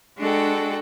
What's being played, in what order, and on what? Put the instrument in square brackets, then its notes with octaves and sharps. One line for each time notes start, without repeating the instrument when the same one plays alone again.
[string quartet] G#3 D4 F#4 A4 F#5 G5